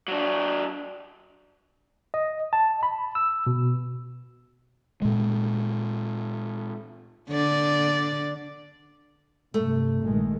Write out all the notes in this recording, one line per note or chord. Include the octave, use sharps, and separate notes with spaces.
F#3 D4
D#5
A5
B5
E6
B2
A#2 G#3
D3 D5
G2 C3 A3
A#1 D#3 G#3